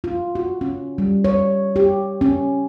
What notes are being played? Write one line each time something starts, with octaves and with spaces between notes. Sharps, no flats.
F4
F#4
C#4
G3
C#5
G4
C#4